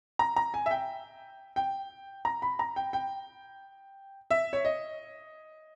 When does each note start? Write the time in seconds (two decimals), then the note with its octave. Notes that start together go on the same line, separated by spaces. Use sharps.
0.19 A#5
0.36 A#5
0.54 G#5
0.66 E5
0.71 G5
1.56 G5
2.25 A#5
2.42 B5
2.59 A#5
2.76 G5
2.93 G5
4.31 E5
4.53 C#5
4.65 D#5